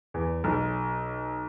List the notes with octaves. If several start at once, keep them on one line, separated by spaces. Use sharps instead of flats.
E2
B1